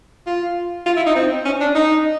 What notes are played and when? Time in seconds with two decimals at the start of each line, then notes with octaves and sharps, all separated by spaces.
0.26 F4
0.86 F4
0.96 E4
1.06 D#4
1.15 C4
1.45 C#4
1.61 D4
1.75 D#4